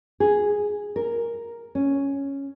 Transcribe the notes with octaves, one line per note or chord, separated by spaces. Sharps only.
G#4
A#4
C#4